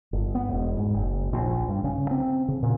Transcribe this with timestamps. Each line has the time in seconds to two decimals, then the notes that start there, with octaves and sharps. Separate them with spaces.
0.13 G1
0.35 B3
0.49 E1
0.77 G#2
0.94 F#1
1.33 A#1
1.69 G2
1.84 C#3
2.11 C4
2.48 C#3
2.63 A#2